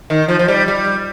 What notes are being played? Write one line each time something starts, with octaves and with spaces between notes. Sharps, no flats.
D#3
F3
F3
G3
G3